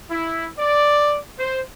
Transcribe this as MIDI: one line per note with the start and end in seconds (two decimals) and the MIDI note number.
0.10 0.47 64
0.59 1.18 74
1.39 1.61 72